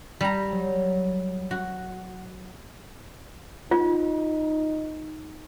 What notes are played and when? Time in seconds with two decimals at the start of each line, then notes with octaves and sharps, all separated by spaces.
0.21 G3 A#5
0.52 F#3
1.51 F#4
3.71 D#4 F4